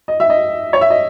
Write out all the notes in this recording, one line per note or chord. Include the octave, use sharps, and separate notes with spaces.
D#5
E5
D#5
C#5
E5
D#5